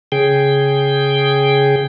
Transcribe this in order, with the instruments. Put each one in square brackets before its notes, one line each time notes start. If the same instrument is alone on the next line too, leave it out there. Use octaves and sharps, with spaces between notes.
[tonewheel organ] C#3 G#4 G5